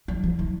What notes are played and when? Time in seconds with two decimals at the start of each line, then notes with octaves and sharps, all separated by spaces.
0.08 F#3
0.24 F3
0.39 E3